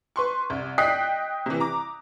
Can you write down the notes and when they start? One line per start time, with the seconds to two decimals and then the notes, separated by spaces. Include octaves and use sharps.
0.16 B4 C6 C#6
0.50 C2
0.78 D#5 G5 D#6 F#6 B6 C7
1.46 C3 E3
1.60 A#5 D6